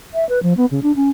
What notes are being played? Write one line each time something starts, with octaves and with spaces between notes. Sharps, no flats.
E5
B4
F3
B3
C#3
D4
C#4